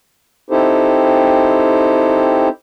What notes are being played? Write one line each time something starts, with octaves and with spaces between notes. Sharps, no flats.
C4 D#4 E4 G4 A4 C5